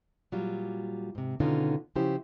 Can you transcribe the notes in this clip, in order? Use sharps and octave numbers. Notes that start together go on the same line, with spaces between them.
A#2 F#3 G3 F4
G#2 C3
B2 D3 D#3 C#4 D#4 F4
C#3 F3 C#4 E4 G4 C5